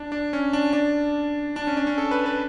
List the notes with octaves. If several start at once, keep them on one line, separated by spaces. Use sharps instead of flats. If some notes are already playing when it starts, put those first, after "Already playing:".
Already playing: D4
D4
C#4
D4
D4
D4
C#4
D4
C#4
A4
B4
B4